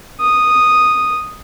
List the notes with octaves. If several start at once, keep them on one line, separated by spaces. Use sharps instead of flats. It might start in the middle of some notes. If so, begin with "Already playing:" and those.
D#6